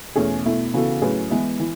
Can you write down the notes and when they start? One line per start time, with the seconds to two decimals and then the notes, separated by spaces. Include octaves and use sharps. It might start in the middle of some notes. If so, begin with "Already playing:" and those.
0.16 E2 B2 A3 C#4 G#4
0.45 B2 A3 E4
0.74 C#3 E3 B3 F#4 A4
1.01 A2 F#3 C#4 G#4 B4
1.30 E3 G#3 B3 E4
1.60 E3